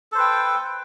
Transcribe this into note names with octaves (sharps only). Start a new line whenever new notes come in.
A4 B4 C5 G5